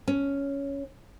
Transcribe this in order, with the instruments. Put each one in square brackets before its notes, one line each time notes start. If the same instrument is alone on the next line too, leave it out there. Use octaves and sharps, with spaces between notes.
[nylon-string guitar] C#4